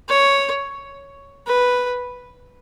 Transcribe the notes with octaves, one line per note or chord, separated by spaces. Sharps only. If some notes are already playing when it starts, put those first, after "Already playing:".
C#5
B4